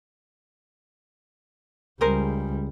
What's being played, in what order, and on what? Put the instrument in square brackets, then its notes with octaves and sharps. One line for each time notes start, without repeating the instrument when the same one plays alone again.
[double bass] C#2 G3 [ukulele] G#4 A#4 C5